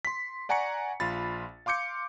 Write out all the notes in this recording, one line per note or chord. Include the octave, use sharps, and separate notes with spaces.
C6 B6
D5 F#5 G#5 A#5 C#6 C#7
A#1 F4 B5 A6
F5 C6 D6 G6 C#7